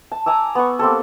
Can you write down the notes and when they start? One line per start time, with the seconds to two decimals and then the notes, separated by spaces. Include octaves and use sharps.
0.12 A5
0.26 G#5 A#5 D6 E6
0.55 B3 C#6
0.79 A#3 C4 G4 A4